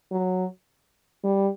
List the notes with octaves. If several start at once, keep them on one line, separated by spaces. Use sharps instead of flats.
F#3
G3